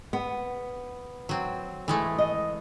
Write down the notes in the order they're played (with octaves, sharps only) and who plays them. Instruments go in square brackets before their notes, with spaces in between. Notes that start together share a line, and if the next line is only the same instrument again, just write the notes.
[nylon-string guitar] B3
[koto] F#3 C4
E3 G#3 A3
[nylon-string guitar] D#5